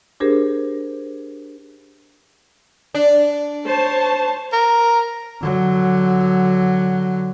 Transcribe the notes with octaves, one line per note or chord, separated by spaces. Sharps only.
D4 G4 G#4 A#4 C5
D4
C5 C#5 A5
A#4
D3 F#3